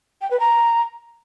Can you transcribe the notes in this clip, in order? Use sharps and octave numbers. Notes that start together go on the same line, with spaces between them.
G5
B4
A#5